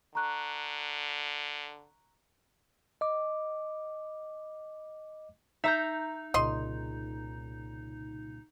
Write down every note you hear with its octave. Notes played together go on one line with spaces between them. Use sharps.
D3 A#5 C#6 F#6
D#5 D6
D#4 E5 A#5 G6
C2 A#2 C#3 D#5 C6